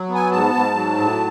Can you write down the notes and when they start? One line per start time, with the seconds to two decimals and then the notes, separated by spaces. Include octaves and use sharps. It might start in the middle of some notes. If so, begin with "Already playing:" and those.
Already playing: F#3
0.09 B3
0.15 G#5
0.31 G#2 A5
0.54 G#2
0.75 F#3
0.98 A2